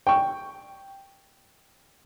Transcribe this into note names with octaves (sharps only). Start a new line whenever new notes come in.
G5 C#6